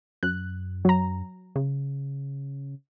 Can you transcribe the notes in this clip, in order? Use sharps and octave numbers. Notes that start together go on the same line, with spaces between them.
F#2 F#6
F#3 A#5
C#3